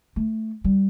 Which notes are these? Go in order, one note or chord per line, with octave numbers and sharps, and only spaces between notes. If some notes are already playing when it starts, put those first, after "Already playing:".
A3
G3